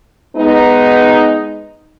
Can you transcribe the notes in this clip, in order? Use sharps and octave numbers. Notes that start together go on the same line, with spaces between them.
G#3 B3 D#4